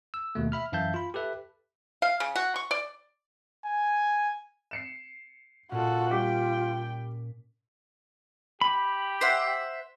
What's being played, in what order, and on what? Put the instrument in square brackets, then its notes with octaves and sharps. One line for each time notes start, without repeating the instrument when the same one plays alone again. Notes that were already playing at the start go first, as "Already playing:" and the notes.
[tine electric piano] E6
D#2 B2 A3
E5 B5 F6
F#2 E3 E5 F5 A5 G6
F4 B5
G4 A4 B4 E5
[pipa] F5
C#3
F#4
C#6
D5
[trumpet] G#5
[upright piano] C7 C#7 E7
[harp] A#2 C#4 [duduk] F4 [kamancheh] F#4 A4
[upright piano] G3 D6 B6 [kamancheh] G5
[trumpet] G4 [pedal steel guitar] B5
[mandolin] C5 E5 F#5